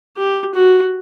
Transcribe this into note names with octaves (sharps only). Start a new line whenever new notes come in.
G4
F#4